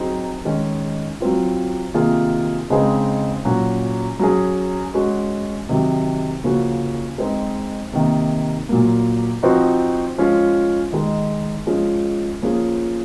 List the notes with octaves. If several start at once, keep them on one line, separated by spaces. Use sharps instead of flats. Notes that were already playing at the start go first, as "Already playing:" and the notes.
Already playing: F#3 C4 D#4 G#4
D#3 G#3 C#4
F#3 C4 F4
C3 D#3 A#3 F4 G#4
C#3 G#3 C4 D#4 G#4
A#2 F#3 C#4 F#4
F#3 C#4 G#4
G#3 C#4 F#4
C3 D#3 F#3
C#3 F3 A#3 C#4 F#4
G#3 C4 D#4
C3 D#3 A#3
A#2 F#3 A#3
F3 C4 D#4 F#4
F3 G#3 C#4 F4
D#3 G#3 D#4
F3 G#3 C#4 F4 G#4
F3 A#3 C#4 F4 G#4